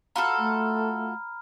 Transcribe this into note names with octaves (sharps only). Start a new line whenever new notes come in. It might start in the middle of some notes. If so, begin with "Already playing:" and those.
F4 F#4 A4 A#5 B5 F6
A3